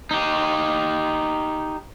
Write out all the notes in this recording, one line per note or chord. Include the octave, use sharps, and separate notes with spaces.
D#4 G4